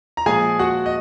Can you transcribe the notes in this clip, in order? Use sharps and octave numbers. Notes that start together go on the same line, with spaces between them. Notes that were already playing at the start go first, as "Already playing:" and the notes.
A#5
A#2 F3 G#3 G#4 G#5
F#4 F#5
D#5